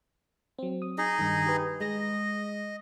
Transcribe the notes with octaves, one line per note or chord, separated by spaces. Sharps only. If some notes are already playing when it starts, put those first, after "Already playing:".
F#3 C4
D#6
D#4 G#4 D#5
G2 D#3
G4 B4
G#3 D#5 A#6